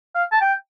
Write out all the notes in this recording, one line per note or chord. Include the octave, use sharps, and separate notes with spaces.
F5
A5
G5